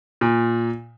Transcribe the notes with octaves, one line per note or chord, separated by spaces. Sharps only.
A#2